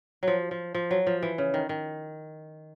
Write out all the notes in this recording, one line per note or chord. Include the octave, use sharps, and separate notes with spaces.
F3 F#3
F3
F3
F#3
F3
E3
C#3
D#3
D#3